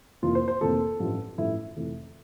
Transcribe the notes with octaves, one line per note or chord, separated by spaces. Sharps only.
F1 F2 E3 A#3 F4
C5
C5
F1 F2 E3 A#3 A4
A1 G2 F3 A3 E4
A1 G2 F3 A3 E4
F1 F2 E3 A3